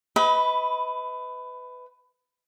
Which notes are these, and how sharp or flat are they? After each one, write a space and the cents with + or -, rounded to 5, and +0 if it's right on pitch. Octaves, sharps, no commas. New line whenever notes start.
B4 +20 D#5 +40 B5 +0